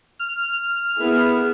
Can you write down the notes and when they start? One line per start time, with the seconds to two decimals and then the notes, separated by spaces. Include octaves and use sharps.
0.19 F6
0.97 B3 E4 G#4